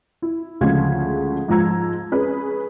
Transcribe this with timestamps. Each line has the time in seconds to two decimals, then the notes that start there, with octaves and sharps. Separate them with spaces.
0.22 E4
0.61 D2 C#3 F3 G#3 F5 G#6
1.48 G#2 F3 F4 A#5 E6 G#6
2.12 C#4 G#4 B4